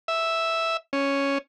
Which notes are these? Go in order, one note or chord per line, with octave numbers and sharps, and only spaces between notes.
E5
C#4